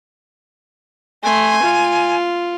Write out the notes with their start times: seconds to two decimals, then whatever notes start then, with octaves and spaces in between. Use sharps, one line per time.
1.23 A3 G#5 C6
1.63 F4